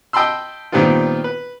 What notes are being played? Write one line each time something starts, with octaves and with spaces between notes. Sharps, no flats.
D#5 G5 A5 B5 C6 E6
A#2 D#3 G3 B3 C4 F4
B4